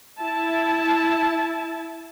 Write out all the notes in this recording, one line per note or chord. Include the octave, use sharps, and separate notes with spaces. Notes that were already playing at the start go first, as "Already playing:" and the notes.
E4 A5